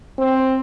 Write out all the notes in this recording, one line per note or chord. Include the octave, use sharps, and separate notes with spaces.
C4